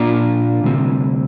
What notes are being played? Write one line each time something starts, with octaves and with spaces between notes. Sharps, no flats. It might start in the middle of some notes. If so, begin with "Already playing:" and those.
Already playing: A#2 A#3 D4 F4 D5
D2 C3 G3 C4